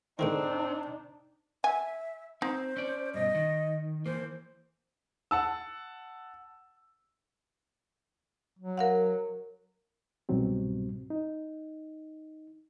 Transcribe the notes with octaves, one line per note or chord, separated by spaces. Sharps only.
G#2 D3 D#3 C4 D4 D#4
E5 G#5
C4 D#4 C5
C#4 D5
G2 B2 D#5
D#3
E3 A#3 C5
F#5 A5 E6
F#3
A#4 F5 F#5
C2 G#2 B2 F#3 G3 C4
D#4